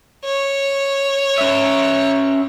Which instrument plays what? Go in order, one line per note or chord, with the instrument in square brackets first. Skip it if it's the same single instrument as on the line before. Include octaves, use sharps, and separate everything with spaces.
[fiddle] C#5
[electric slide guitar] C#4 E5